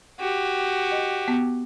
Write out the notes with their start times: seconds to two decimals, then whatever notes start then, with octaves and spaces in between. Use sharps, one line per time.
0.19 F#4 G4
0.92 D#5
1.28 B3